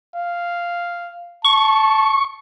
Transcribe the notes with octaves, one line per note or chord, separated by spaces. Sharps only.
F5
A5 C#6